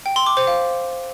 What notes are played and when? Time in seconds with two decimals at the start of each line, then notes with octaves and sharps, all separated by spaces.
0.06 G5
0.16 C6
0.26 D6
0.37 C5
0.47 F5